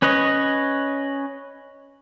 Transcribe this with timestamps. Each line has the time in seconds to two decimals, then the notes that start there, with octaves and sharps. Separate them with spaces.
0.02 C#4 B4 C#5 D#5